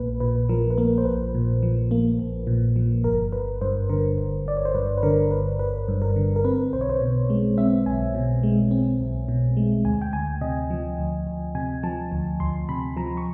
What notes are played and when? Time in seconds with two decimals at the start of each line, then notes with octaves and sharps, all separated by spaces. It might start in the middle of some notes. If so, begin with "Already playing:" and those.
Already playing: A#1 A#3 B4
0.20 A#2 B4
0.49 F3 A#4
0.70 B4
0.78 A#3 A#4
0.98 C5
1.05 A#1 B4
1.35 A#2
1.63 F3
1.91 A#3
2.19 A#1
2.47 A#2
2.76 F3
3.04 G1 A#4
3.33 G1 B4
3.61 G2 C5
3.89 D3 A#4
4.18 G1
4.46 G1 D5
4.57 C#5
4.65 C5
4.74 G2 B4
4.98 B4
5.03 D3 A#4
5.31 G1 B4
5.59 G1 B4
5.88 G2
6.02 A#4
6.16 D3
6.36 A#4
6.44 C4 B4
6.73 B1 C5
6.81 C#5
6.90 C5
7.01 B2
7.30 G#3
7.58 C4 E5
7.86 B1 G#5
8.15 B2
8.43 G#3
8.71 C4
9.00 B1
9.28 B2
9.57 G#3
9.85 D2 G#5
10.02 G5
10.13 D2 G#5
10.41 C3 D#5
10.70 F3
10.98 D2
11.27 D2
11.55 C3 G#5
11.83 F3 A5
12.12 D2
12.40 D2 C6
12.69 C3 B5
12.97 F3 A#5
13.17 C#6